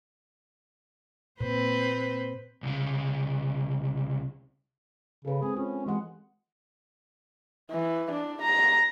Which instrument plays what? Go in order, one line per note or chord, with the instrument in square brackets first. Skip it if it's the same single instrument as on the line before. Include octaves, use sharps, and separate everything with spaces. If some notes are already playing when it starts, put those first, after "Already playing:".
[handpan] A#2 [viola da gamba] C4 B4 C5
[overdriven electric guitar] C2 C#3
[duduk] C#3 [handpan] A4 B4
[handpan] G#3 C4 [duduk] G#4
[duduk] C#4 [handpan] F4
[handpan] E3 G4 F#5 [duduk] G#3
[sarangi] E3
D4
A#5